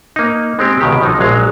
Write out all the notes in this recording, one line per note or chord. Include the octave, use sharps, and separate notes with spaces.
A#3 D#4
G#3 C4 G4
C#2 B2 D#3 G4
F3 F#3 D#4
A#1 F#3 G#3 F5